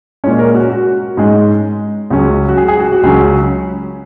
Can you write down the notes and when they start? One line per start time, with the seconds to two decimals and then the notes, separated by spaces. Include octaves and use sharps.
0.24 A#2 G#3 C#4 C#5
0.39 A#4
0.55 F#4
0.70 F#4
1.17 G#2 G#3 C#4
2.11 C#2 C#3 F#3 C#4
2.49 F#4
2.57 G#4
2.68 G#4
2.80 F#4
2.92 F#4
3.03 C#2 C#3 F#3 C#4 G#4